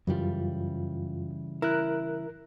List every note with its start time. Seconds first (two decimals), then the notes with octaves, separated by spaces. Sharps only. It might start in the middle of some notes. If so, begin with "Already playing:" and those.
0.07 F#2 C#3 E3 G3 F4
1.62 E4 A#4 F#6